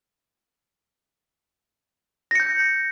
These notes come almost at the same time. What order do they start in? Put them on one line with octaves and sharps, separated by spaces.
A#6 C#7 G6